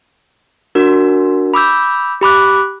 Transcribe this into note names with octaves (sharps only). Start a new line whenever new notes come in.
D4 F#4 A#4
B5 D6 E6 G6
G4 B5 D6 F#6